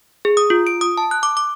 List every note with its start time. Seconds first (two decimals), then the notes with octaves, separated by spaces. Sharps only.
0.25 G#4
0.37 D#6
0.50 F4
0.67 D7
0.81 D#6
0.98 A5
1.11 F#6
1.23 D6
1.37 D6